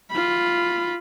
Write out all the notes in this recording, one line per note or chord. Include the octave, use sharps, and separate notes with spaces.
F4 B5